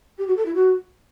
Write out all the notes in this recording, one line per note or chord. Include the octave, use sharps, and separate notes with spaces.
G4
F#4
A4
E4
F#4